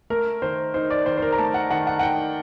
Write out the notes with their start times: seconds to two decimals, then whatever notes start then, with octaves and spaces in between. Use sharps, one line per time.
0.10 A3 A#4
0.42 D#3 C5
0.74 D#4 C5
0.90 D5
1.06 D#3 C5
1.17 C5
1.22 A#4
1.32 A#5
1.38 A3 A5
1.54 F#5
1.71 D#3 F#5
1.87 F#5
1.99 F#5
2.03 D#4 G5